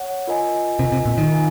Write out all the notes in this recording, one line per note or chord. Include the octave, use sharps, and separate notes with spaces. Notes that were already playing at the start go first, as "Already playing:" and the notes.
Already playing: C#5 F#5
F4 A#4 D#5 G#5
C3 F4 A#4 D#5 G#5
C3
A#2
D#3
F4 A#4 F5 G#5